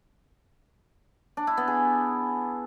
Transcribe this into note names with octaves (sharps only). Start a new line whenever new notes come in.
D4
E4
B3
G#4